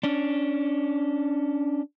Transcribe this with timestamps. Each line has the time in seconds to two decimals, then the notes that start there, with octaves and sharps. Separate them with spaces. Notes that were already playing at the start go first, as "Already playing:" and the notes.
0.03 C#4 D4